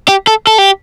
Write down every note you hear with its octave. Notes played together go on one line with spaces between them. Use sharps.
G4
A4
A4
G4